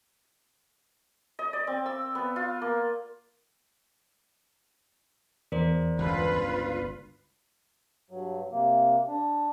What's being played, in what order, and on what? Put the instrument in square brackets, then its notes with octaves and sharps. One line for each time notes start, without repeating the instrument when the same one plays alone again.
[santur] D#5
D5
C4
E6
B3
F4
A#3
[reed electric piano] E2 [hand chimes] A#4 C5 D5
[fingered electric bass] G1 C#2 [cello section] F4 B4
[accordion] G2 F#3
C3 A#3
D4